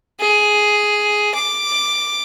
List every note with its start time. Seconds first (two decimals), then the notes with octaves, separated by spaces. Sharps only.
0.20 G#4
1.35 D6